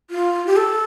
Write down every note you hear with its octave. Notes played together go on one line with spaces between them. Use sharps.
F4
G4
A4